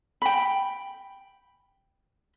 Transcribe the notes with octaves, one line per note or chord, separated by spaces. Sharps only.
G5 B5